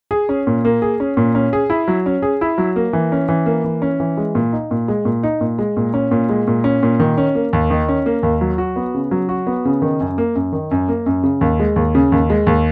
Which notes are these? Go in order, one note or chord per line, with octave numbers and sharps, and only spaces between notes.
G#4
C#4
A#2
A#3
G#4
C#4
A#2
C#4
G#4
E4
F#3
C#4
G#4
E4
F#3
A#3
E3
C#4
E3
A#3
E3
C#4
E3
G#3
A#2
D#4
A#2
G#3
A#2
D#4
A#2
G#3
A#2
C#4
A#2
G#3
A#2
C#4
A#2
D#3
C#4
A#3
D#2
D#3
C#4
A#3
D#2
F#3
F#4
B3
C#3
F#3
F#4
B3
C#3
D#3
F#2
A#3
F#2
D#3
F#2
A#3
F#2
C#3
D#2
G#3
D#2
C#3
D#2
G#3
D#2